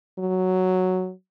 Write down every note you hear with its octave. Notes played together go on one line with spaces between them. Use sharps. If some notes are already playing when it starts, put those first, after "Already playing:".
F#3